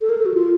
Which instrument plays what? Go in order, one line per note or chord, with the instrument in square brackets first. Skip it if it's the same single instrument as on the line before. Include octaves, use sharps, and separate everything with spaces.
[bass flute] A4
A#4
A4
F#4
F4